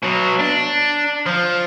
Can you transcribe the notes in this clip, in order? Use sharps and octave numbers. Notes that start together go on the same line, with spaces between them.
B2 F#3
D4
F3